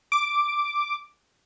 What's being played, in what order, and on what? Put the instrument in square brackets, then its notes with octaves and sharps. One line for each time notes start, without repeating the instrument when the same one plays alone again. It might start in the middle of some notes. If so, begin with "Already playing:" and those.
[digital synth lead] D6